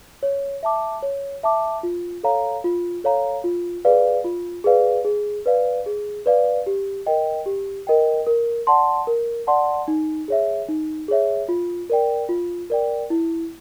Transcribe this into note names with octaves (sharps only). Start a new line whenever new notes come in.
C#5
E5 A5 D6
C#5
E5 A5 D6
F4
A4 C#5 F5 A#5
F4
A4 C#5 F5 A#5
F4
G#4 B4 D5 F5
F4
G#4 B4 D5 F5
G#4
B4 D5 F5
G#4
B4 D5 F5
G4
A#4 D#5 G5
G4
A#4 D#5 G5
A#4
D5 F#5 A5 C6
A#4
D5 F#5 A5 C6
D#4
G#4 C#5 E5
D#4
G#4 C#5 E5
F4
A#4 D5 G5
F4
A#4 D5 G5
E4